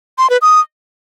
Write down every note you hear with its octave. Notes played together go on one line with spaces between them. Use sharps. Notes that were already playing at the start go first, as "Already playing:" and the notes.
C6
B4
D#6